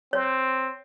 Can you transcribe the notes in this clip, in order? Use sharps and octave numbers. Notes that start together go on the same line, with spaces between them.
C4 C#5